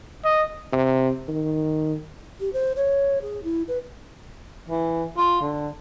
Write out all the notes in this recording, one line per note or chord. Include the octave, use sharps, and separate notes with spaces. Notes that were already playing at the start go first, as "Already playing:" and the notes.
D#5
C3
D#3
G4
C5
C#5
G#4
E4
B4
E3
F4
D3